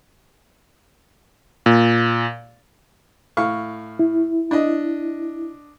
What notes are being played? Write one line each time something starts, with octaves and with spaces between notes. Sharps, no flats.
A#2
A2 F5 C#6
E4
D4 D#5